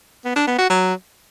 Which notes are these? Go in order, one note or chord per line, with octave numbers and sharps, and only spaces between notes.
B3
D4
B3
F#4
F#3